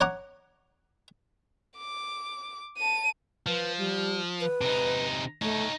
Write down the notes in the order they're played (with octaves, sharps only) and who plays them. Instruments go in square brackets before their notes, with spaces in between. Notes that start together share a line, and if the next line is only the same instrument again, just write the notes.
[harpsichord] C#5 F#5 A#5 D6
[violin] D6
A5 D#7
[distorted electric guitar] F3 [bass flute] B4
[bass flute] G3
B4
[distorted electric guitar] C3 D#4
[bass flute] A3 [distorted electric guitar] D#4 C#5